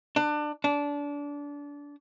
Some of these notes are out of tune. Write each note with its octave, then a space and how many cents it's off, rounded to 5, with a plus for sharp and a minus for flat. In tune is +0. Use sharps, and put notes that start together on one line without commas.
D4 +25
D4 -25